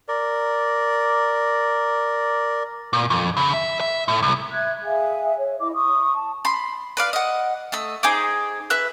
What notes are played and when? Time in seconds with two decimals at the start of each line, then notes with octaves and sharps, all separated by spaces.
0.08 A#4 D5
2.93 A#2
3.10 F2
3.37 C#3
3.54 E5
3.80 E5
4.08 A2
4.23 C2
4.52 E5 F#6 G#6
4.83 G#4 E5 F5 G#5
5.38 C#5
5.60 E4 D#5 D6
5.74 C#6 D#6
6.14 A5
6.45 B5 C6
6.97 B4 D5 F5
7.13 D#5 F#5
7.72 A3 D#5 E6
8.03 D#4 G#4 C5 D6
8.70 B4 E5 F#6